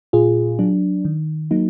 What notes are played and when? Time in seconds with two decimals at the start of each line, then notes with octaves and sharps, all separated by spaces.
0.13 A#2 F4 G#4
0.59 F#3 D4
1.05 D#3
1.51 F#3 A#3 D#4